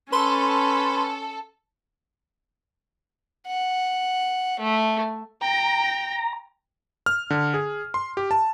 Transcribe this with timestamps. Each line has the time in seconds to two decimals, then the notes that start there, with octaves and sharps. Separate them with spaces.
0.13 C#4 A4 B4 C6
3.47 F#5
4.59 A3
5.41 G5 A#5
7.06 F6
7.30 D3
7.54 G#4
7.94 C6
8.17 G4
8.31 A5